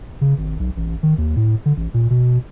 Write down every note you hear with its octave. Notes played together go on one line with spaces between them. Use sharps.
C#3
G#1
B1
A1
D#3
D#2
A2
D3
A1
A#2
B2